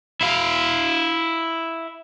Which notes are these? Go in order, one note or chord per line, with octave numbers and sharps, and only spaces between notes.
E4 F5